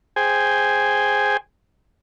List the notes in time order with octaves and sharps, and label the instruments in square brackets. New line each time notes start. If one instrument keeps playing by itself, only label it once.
[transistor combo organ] G#4 C5 G5 G#5